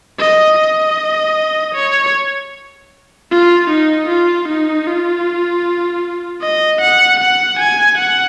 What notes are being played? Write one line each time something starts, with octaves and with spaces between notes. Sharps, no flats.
D#5
D#5
C#5
F4
D#4
F4
D#4
F4
D#5
F#5
F#5
G#5
F#5